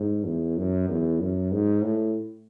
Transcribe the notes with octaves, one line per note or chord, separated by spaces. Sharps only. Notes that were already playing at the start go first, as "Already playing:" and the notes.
Already playing: G#2
E2
F#2
E2
F#2
G#2
A2